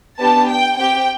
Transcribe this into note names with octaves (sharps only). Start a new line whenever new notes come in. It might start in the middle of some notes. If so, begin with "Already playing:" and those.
B3 D4 G4 A5
G5
C4 G4 G5